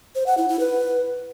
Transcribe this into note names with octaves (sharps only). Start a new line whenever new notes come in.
C5
F#5
E4
E4
B4